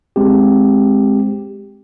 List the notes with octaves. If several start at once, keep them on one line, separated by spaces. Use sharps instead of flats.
G#3 C4 G4